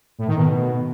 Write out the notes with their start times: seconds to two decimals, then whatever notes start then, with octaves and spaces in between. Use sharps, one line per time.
0.19 A2
0.28 D#3
0.37 B2